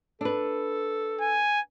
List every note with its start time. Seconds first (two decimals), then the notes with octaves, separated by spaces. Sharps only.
0.21 D4 A4 B4
1.21 G#5